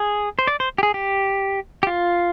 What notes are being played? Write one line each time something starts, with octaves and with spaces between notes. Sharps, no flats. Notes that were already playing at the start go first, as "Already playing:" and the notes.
Already playing: G#4
C5
D5
C5
G4
G#4
G4
G4
F4